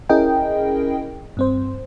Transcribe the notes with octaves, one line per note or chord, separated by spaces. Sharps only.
C#4 E4 G#4 A#4 D#5 G5
G2 C4 C5